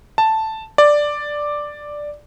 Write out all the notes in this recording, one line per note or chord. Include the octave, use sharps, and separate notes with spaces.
A5
D5